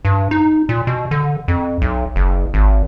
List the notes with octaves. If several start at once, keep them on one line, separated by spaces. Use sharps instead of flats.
G2
D#4
A#2
B2
D3
F2
B1
F#1
G#1